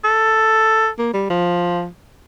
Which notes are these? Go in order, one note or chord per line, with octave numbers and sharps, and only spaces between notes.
A4
A#3
G3
F3